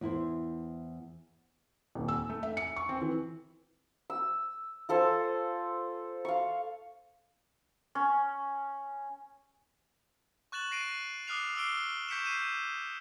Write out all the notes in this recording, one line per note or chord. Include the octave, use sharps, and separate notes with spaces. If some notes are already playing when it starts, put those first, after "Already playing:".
E2 E4 C5
D#1
E6
A3
E5
C#7
C#6
C4
E3
E6
F4 A4 C5 G#5
F5 C#6
C#4
C#6 F#6 A6 E7 F#7
A#6 C7 D7 D#7
D6 D#6 F6 F#6 C7 F7
D6 E6 F6 C7 D7 G7
C#6 G6 B6 C#7 D7 E7
C7 D#7 E7